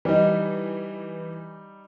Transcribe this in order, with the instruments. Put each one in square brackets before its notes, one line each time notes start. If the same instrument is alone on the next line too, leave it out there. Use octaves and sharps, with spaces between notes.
[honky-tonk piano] E3 [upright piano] G3 D#4